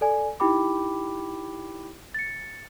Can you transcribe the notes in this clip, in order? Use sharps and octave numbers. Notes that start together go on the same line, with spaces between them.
A4 D5 G#5
D#4 E4 G4 G5 B5 D6
A6 C#7